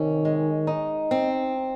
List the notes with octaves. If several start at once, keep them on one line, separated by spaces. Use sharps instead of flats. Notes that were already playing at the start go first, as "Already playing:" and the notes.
Already playing: C3 D#3 C#4
G#3
D#4
C4